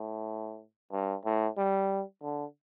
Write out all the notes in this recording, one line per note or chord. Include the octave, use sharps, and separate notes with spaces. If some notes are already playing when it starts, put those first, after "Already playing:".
Already playing: A2
G2
A2
G3
D3